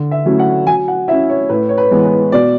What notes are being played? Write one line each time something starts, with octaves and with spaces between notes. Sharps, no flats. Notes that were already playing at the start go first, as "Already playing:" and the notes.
Already playing: D3
E5
F#3 A3 C#4 E4
F#5
F#3 G#5
F#5
C#4 E4 E5
C#5
A2 B4
C#5
B4
E3 G#3 B3
B4
B2 D5